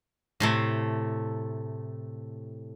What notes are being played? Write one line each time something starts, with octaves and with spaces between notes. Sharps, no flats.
A2 C3 A3